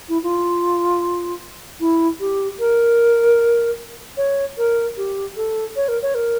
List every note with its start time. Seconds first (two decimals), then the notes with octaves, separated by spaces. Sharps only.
0.09 E4
0.23 F4
1.80 E4
2.20 G4
2.59 A#4
4.17 C#5
4.58 A#4
4.97 G4
5.36 A4
5.76 C#5
5.88 A#4
6.02 C#5
6.15 A#4